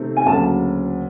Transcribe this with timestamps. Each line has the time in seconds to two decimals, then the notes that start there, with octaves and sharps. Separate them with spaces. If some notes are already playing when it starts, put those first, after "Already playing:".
Already playing: C3 D#3 A3 C4
0.16 G#5
0.26 D2 C#3 F#3 A#3 A5